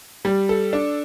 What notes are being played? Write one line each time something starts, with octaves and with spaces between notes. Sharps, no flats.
G3
A4
D4